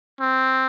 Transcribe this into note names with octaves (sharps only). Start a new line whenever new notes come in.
C4